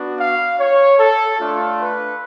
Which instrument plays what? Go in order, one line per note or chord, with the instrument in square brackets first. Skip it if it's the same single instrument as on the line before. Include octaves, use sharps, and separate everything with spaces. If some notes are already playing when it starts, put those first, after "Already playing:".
Already playing: [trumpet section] B3 D4 F#4
F5
C#5
A4
A3 D4 F4
B4